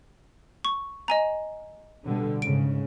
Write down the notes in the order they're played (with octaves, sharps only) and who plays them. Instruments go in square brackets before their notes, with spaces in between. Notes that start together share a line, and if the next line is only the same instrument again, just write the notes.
[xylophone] C#6
D#5 G#5 A#5
[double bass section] B2 D3 G3
[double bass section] G#2 C#3 [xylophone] D7